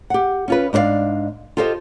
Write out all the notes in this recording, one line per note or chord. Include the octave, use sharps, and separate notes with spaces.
G4 F#5
C#4 F4 B4
G#2 D4 C5 D5 F5
F4 G4 A4 C5 D5 D#5